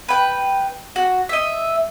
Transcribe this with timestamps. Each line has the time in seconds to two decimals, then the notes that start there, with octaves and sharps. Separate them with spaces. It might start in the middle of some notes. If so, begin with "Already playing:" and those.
0.08 B4 G5
0.96 F#4
1.29 D#5 E5